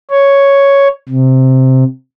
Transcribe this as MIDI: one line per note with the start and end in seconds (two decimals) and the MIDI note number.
0.11 0.88 73
1.09 1.84 48